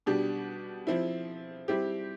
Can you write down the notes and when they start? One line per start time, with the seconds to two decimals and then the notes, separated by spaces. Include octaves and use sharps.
0.06 B2 G3 D4 G4
0.87 F3 C4 E4
1.68 G3 C4 E4 G4